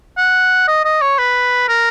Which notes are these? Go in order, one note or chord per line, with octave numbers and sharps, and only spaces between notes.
F#5
D#5
D#5
C#5
B4
A#4